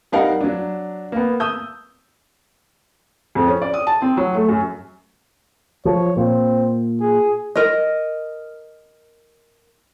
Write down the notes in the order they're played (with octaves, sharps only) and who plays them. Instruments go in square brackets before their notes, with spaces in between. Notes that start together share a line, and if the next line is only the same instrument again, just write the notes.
[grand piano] G3 D#4 A#4 F5 F#5
F#3 D4
A#3 B3
D#6 E6 G6
[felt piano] F2
C#4
D5
D#6
A5
C4
F#3
A3
F#2
[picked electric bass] F3 [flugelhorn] C#5
[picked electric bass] A#2 [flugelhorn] C4
[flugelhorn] G#4
[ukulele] A#4 D#5